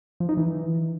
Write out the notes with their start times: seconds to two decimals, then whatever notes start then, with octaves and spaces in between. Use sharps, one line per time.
0.20 F3
0.29 D#4
0.37 E3